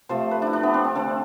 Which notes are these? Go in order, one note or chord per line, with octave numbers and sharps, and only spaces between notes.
C3 F3 A3 C5
B4
D4 E4
D4
B3
C4
C4
D3 A3 C4